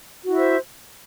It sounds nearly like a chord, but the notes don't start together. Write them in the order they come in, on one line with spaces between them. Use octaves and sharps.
F#4 E4 E5 C5